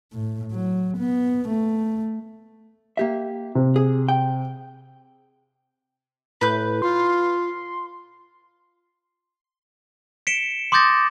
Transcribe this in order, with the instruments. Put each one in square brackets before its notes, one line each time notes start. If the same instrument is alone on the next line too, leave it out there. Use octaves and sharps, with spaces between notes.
[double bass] A2
F#3
B3
A3
[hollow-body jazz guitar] A#3 G4 E5
[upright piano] C3
[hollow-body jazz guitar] G#4
G5
[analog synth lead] A2 [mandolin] B4 G6
[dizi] F4 [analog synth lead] C6
[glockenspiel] B6 C#7 D7 E7 G7
C6 D6 D#6 G6 A6 A#6